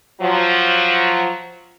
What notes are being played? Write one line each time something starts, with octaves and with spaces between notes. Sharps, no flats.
F3 F#3